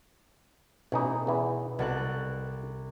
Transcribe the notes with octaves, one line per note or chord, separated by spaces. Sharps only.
A1 B2 E3 D#4
E2 E3
C2 B2 A4 F#6